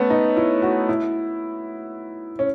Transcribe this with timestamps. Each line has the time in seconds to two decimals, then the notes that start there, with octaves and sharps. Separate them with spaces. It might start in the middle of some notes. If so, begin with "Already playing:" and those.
Already playing: A3 B3 C#4
0.10 D#4
0.37 E4
0.62 F#4
0.89 E4
2.39 C#4